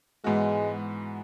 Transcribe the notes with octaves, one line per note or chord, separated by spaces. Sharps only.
G#2 E3 G#3 B3 F#4